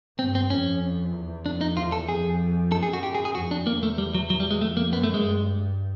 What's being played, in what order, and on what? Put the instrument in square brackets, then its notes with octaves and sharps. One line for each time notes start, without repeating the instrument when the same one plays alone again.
[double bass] G2 [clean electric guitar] C4
[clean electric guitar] C4
[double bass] F2 [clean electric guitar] C#4
[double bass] E2
[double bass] F2 [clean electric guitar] D4
[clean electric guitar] D#4
[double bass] E2 [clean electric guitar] F4
[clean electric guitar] A4
[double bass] F2 [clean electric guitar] G#4
[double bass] F#2 [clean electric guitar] A4
[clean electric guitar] G#4
F#4
G4
G#4
G#4
[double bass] F2 [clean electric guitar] F#4
[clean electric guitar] D4
[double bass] E2 [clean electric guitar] A#3
[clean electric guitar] A3
G3
F#3
F#3
G3
G#3
[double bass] F2 [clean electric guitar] A3
[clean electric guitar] A#3
[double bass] F#2 [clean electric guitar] B3
[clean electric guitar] A3
G#3
[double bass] G2